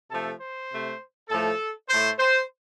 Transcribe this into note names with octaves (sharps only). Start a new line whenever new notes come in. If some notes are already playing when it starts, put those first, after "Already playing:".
C3 F3 A3 A4
C5
C3 A3
A2 F3 A3 A4
A2 A3 C5
C5